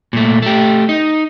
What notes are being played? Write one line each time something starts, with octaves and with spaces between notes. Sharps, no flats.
A#2 A3
A3 G4
D#4